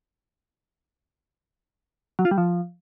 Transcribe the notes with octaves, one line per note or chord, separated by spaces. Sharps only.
F#3
F4
G3
F3